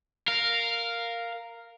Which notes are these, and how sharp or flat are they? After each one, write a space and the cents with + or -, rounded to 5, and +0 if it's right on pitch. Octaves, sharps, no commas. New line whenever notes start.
A#4 -5 F5 +0